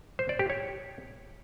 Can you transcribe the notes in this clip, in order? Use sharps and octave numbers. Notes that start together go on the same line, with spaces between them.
C5
D5
G4
C#5